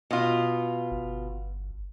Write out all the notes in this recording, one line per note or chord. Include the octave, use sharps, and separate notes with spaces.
B2 F4
G1